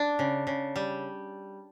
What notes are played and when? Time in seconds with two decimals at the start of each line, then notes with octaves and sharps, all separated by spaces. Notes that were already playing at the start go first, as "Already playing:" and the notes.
Already playing: D4
0.19 C#3
0.47 C#3
0.76 G3